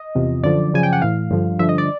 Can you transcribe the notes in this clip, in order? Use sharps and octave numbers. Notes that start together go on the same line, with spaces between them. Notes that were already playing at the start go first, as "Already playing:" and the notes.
Already playing: D#5
E2 C3 F3
F#2 D3 F3 D5
F#2 C#3 F3 G#5
G5
F#5
A2 E3 F5
G2 D3 F3
G2 D3 F3 E5
D#5
D5